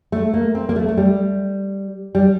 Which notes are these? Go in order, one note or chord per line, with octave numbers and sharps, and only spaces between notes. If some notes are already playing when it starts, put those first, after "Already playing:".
A3
A#3
C4
A#3
A3
A3
G3
G3